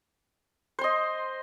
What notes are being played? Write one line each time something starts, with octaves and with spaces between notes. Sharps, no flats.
C5 D#5 C6